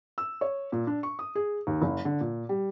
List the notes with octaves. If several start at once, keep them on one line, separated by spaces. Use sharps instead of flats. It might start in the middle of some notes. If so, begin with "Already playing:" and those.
E6
C#5
A#2
D4
C#6
D#6
G#4
D#2
F#1
D3
A#2
G3